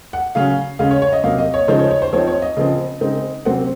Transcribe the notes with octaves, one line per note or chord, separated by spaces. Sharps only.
F#5
C#3 F#3 C#4 F5
C#3 G#3 C#4 F5
C#5
C#5
D#5
C3 F#3 A#3 F5
D#5
C#5
C#3 F3 G#3 D#4 C5
C#5
C#5
C5
F3 C4 D#4 C#5
C#5
D#5
C#3 F3 C4
C#3 G#3 C4 D#4
C3 F#3 C4 F#5